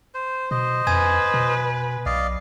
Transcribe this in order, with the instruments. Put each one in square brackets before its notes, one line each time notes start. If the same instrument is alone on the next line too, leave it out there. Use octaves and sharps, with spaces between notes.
[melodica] C5
[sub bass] B2 [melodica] C5 D#5
[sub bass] F2 [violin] B4 [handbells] G#5 G#6
[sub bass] B2
[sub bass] B1 [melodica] D5 D#5 F5